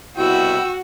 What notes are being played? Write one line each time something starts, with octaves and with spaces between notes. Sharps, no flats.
C2 B2 E4 F#4 G5 E6